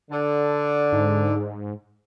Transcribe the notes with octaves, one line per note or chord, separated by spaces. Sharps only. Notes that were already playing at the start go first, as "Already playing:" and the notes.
D3
G#2